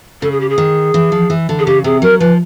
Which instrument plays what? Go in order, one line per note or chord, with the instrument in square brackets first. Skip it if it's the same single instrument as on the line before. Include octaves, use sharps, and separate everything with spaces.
[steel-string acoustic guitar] C#3 [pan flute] A4
[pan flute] G#4
G4
G#4
[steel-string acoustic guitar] D#3
E3
F3
E3
D3
[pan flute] G#4
[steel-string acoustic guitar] C#3 [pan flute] G4
[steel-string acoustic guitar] C3 [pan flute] G#4
[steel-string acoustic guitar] F#3 [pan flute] A#4
[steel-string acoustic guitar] F3 [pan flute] B4